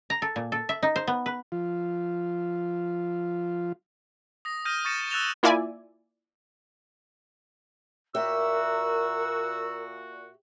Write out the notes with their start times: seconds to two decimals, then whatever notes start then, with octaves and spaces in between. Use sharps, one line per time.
0.10 A#5
0.22 A4
0.36 A#2
0.52 A4
0.69 E5
0.83 D#4
0.96 C5
1.07 B3
1.26 B4
1.52 F3 F4
4.45 D#6 A#6
4.65 D#6 F6 G6 A#6 D#7
4.85 C#6 G6 A6 A#6 C#7 E7
5.10 E6 F#6 A6 E7 F7 G7
5.43 A#3 E4 F4 D5 E5 G#5
8.15 A#2 F#4 G4 A#4 E5 E6